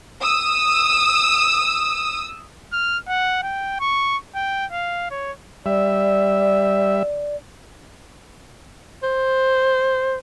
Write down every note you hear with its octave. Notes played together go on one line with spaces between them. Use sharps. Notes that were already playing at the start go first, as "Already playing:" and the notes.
D#6 E6
F6
F#5
G5
C#6
G5
F5
C#5
G3 D5 E5
C5